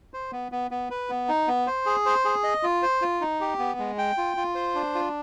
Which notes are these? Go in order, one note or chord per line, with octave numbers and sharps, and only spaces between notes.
C5
B3
B3
B3
B4
B3
D#4
B3
C5
G#4
C5
G#4
D#5
F4
C5
F4
D#4
G4
B3
G#3
G5
F4
F4
C5
D4
F4